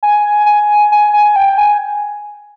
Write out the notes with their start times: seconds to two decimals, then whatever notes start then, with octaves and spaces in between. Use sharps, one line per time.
0.03 G#5
0.46 G#5
0.92 G#5
1.13 G#5
1.36 G5
1.58 G#5